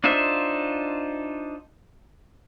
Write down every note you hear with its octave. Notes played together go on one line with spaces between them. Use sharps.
D4 D#4 F4 C5 E5